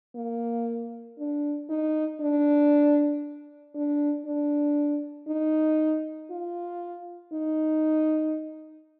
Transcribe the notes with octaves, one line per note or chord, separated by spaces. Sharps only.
A#3
D4
D#4
D4
D4
D4
D#4
F4
D#4